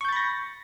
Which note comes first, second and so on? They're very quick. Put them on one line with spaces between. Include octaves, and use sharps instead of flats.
C#6 G6 A6 B5 A#6